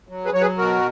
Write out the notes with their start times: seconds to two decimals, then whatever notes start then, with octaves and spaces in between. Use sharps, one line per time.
0.09 F#3
0.25 G#4 B4
0.33 F#3 C#5
0.41 G#4 B4
0.57 B2 F#4 A#4